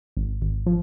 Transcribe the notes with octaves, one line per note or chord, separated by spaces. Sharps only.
G#1
G#1
F3